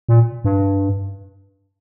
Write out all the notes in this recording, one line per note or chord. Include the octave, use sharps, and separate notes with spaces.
A#2
G2